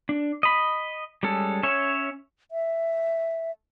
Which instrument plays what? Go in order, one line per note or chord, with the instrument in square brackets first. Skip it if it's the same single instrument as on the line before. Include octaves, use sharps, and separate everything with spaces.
[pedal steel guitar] D4
D#5 B5
G3 G#3 C#4 A4
C#4 C#5 E5
[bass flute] E5